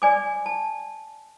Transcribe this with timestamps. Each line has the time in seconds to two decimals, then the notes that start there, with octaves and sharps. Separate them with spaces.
0.02 D5 G#5 D6
0.46 A5